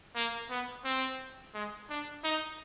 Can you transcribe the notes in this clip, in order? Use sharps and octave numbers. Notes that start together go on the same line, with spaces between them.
A#3
B3
C4
G#3
D4
D#4